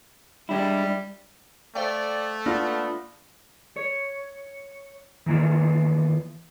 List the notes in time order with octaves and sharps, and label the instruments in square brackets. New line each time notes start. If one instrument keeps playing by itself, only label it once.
[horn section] G3 [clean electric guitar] G#3 D4 E4
[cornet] A3 [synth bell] C5 F5 G5 [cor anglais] D5
[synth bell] A#3 [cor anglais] B3 [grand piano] D4 F4
[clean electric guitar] C#5
D#3 E3 A#3 B3 F4